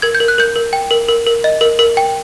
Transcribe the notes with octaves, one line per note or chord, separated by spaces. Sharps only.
A#4 G#6
G6
A#4
F#6
A#4 G6
A#4
G5
A#4
A#4
A#4
D#5
A#4
A#4
G5